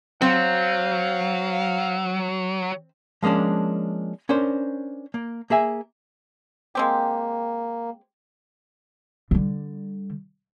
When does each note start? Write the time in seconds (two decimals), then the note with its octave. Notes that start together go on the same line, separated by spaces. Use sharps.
0.22 F#3 C4 F5
3.22 F3 G#3 A#3 C#4 D4
4.29 C#4 D4 A#4 C5
5.14 A#3
5.50 A#3 G#4 E5 G#5
6.75 G#3 A#3 C4 G4
9.31 D3 G3